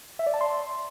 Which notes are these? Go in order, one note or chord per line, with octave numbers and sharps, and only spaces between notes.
E5
D5
A5
C6